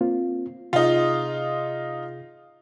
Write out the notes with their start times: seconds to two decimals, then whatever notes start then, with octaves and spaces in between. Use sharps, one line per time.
0.01 A#3 C4 F4
0.73 C3 D#4 F4 G#4